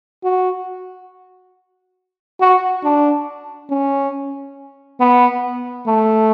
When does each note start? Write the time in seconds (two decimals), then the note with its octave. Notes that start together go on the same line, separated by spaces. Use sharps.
0.24 F#4
2.41 F#4
2.84 D4
3.70 C#4
5.01 B3
5.87 A3